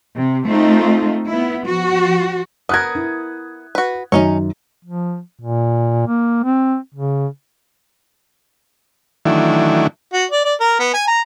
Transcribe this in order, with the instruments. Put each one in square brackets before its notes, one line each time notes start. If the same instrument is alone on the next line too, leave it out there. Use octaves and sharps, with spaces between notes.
[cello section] C3
A3 C4 D#4 F4
B3 E4
F3 F#4
[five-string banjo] B3 A#4 [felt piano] D#6 F#6 G#6
[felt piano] E4
[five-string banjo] F#4 B4
[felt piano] F#2 D#3 [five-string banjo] C#4 D#4 C#5
[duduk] F3
A#2
A#3
C4
C#3
[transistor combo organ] D#3 E3 F#3 A3 D4 E4
[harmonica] F#4
D5
D5
A#4
B3
G#5
A#5